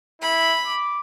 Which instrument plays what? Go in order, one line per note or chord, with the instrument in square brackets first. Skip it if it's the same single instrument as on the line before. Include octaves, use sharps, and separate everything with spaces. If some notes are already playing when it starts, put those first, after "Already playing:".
[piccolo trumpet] E4 [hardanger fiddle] B5
[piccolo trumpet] D6